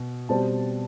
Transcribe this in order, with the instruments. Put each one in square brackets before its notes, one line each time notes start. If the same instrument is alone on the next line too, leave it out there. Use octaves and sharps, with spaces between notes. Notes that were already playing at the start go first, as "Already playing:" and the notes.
Already playing: [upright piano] B2
B2 G3 C4 A5